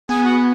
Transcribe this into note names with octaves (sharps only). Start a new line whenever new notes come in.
B3 G#4 G#5
F#4 F#5